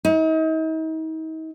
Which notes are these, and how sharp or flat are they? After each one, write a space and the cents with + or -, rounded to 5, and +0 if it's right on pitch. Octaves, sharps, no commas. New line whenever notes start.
D#4 +40